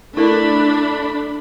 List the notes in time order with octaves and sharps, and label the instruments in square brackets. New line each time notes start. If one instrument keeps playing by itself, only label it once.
[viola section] A3 D4 B5 [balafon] E4 A4 A#4